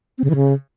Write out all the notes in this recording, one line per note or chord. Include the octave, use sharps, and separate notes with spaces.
C4
C#3
E3
C#3